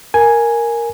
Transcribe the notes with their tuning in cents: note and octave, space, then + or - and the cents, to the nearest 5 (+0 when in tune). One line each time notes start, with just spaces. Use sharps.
A#4 +0 G#5 +0